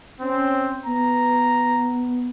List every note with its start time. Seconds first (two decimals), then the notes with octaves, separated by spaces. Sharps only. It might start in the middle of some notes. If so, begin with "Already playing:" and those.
0.21 C4 C#4
0.86 B3 A#5